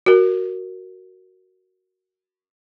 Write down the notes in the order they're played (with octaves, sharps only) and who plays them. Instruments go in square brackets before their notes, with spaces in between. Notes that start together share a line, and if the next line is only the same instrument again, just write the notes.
[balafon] F#4 A#4